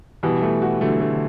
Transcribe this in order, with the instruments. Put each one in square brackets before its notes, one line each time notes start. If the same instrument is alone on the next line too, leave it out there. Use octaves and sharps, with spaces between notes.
[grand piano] B2 [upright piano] E3 G3
[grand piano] A3
F#4
[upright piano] D3 F#3 [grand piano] A3
[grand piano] A3
[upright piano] D3